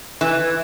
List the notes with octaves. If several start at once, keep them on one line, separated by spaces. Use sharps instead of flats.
E3